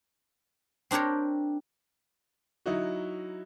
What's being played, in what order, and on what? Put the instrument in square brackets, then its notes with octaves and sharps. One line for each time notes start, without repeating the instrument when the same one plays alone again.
[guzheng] C4 D4 G4 A#4 C#5
[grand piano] F#3 D#4 E4 F#4